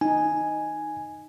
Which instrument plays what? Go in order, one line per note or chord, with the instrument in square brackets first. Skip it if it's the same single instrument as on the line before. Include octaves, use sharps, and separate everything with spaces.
[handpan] D#4 [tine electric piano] G#5